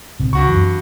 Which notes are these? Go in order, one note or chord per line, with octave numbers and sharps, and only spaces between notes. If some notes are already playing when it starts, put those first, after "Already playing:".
A#1 C3
C#2 G2 F#4 C#6
F#2 E3